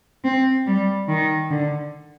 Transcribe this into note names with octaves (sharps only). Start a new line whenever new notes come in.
C4
G3
D#3
D3